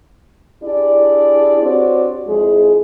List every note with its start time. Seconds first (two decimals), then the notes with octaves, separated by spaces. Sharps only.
0.63 D4 E4 G4 G#4 D5
1.61 C4 D4 F#4 G4 C#5 D5
2.27 F2 G#3 E4 G#4